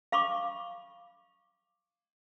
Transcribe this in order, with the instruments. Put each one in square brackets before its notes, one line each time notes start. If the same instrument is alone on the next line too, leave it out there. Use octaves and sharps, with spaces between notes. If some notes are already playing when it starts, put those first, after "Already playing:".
[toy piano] F5 B5 C#6 D6